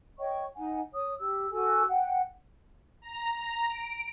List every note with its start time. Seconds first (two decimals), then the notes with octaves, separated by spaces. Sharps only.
0.19 C#5 D#5 G5 C#6
0.56 D#4 F#5 G#5
0.93 C#5 D#6
1.19 G4 E6
1.52 F#4 A4 G#5 E6
1.88 F#5 G5
3.02 A#5
3.39 A#5
3.69 D7